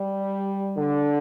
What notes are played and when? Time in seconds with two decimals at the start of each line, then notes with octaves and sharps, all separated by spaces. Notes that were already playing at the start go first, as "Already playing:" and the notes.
Already playing: G3
0.77 D3